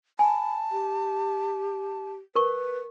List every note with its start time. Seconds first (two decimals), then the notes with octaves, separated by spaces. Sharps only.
0.19 G#5 A5 B5
0.72 G4
2.36 A#4 B4 C#6